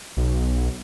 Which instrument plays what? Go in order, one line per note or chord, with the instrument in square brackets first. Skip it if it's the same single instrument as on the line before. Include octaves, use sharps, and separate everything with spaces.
[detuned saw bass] B1